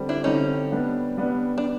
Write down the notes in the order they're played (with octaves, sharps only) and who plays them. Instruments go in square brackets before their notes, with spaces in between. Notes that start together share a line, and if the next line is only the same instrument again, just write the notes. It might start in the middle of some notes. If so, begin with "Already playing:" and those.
Already playing: [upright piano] D3 G3 C4
[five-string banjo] D4 E4
[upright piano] D3 G3 C4 [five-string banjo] C#4 D#4
[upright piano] G3 B3 D4
G3 B3 D4
[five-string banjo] D4